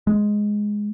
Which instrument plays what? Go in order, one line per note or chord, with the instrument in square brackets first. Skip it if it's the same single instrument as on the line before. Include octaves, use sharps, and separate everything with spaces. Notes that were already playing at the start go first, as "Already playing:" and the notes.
[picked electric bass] G#3